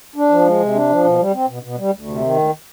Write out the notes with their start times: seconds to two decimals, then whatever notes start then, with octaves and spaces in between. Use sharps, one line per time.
0.16 D4
0.29 F3
0.45 G#3
0.60 C3
0.74 D4
0.89 F3
1.04 B2
1.19 G3
1.33 C4
1.47 B2
1.63 B2
1.78 G3
1.92 D2
2.07 C3
2.22 D#3
2.36 D2